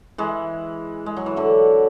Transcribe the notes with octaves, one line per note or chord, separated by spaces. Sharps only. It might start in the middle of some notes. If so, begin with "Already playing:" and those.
E3 G#3
G#3
F#3
E3
D3 F#3